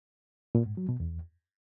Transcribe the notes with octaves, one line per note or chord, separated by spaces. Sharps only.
A#2
G#2
F#3
B2
E2